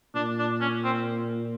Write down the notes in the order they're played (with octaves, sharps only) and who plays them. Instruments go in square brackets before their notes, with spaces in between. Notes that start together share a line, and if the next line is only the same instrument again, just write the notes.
[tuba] A#2 [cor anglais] D4
[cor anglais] D4
C#4
C4